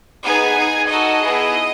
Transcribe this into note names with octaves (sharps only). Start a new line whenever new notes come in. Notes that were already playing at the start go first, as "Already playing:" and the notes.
B3 D#4 G#4 G#5
D#4 G#4
D#4 F#4 A4 D#5
B3 E4 G#4